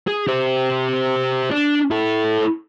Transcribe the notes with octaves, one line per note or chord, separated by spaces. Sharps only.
G#4
G4 C5
D4
E4 A4